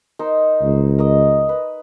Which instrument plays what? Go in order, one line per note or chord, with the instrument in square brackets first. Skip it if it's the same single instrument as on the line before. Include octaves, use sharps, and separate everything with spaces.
[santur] D#4 A#4 C5
[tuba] C#2
[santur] A#4 D#5
B4